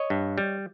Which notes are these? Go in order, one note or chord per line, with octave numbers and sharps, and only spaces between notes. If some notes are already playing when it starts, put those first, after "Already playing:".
Already playing: C#5 D#5
G2
G3